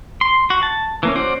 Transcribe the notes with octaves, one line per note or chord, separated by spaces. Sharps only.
C6
F#4
A5
E3 A#3 C#4
C#4 F#4 C5 D5